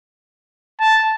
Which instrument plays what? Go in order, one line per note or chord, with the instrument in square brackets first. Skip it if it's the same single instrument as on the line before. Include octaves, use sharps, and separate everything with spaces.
[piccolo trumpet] A5